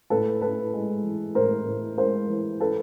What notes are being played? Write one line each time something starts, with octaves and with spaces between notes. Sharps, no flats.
A2 A4 B4
A2 A4 B4
G#3
E3
A2 A#4 C5
A2
G#3 A#4 C5
E3
A4 B4